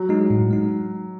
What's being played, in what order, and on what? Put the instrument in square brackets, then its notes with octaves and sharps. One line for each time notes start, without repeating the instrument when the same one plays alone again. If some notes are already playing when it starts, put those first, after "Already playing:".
Already playing: [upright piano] F#3
[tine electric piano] G#3 D#4
A2
G#3 D#4